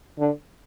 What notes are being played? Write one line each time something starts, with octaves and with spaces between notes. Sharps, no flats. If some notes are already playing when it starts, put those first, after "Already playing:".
D3